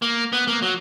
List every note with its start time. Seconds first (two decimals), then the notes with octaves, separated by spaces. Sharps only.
0.02 A#3
0.33 B3
0.48 A#3
0.62 F#3